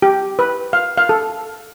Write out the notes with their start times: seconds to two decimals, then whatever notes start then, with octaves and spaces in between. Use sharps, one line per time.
0.02 G4
0.39 B4
0.73 F5
0.97 F5
1.09 A4